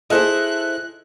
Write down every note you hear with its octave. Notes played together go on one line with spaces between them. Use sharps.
E4 G#4 A4 C5 D#5 E5 F#6